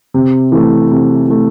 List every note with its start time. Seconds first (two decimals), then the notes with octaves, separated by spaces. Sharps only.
0.14 C3
0.52 E3 A3
0.91 C3
1.28 E3 A3